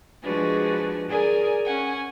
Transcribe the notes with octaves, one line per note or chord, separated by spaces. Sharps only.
F3 G#3 D4 F#4 G#4 B4
G#4 A#4 D5 G#5
C#4 F#5 G#5